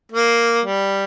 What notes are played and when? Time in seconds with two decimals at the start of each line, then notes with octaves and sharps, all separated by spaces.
0.12 A#3
0.65 G3